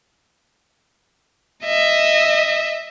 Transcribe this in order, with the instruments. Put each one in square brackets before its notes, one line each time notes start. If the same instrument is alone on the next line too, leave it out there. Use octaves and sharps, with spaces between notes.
[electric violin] D#5 E5